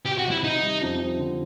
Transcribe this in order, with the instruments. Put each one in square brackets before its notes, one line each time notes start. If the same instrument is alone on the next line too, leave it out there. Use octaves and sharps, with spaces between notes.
[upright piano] C3 [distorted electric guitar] G4
[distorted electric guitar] F#4
[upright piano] C3
[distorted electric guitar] E4
[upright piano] D#3 [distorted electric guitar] D#4
[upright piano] G3
F2
F2
D3